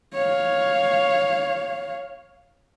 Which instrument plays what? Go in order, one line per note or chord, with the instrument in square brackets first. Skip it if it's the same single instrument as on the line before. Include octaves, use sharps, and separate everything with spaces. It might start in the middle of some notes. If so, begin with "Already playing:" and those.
[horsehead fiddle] C#5 F5